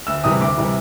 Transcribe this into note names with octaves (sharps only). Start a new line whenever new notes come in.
D2 E6
C3 E3 G3 D#6
D2 D6
C3 E3 G3